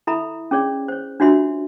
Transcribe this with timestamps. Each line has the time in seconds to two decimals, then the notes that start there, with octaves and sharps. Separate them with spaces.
0.07 E4 A4 E5 A#5 B5
0.51 C#4 G#4 C#5 D5
0.88 C5 C#5
1.20 D4 F4 F#4 C#5 E5 C6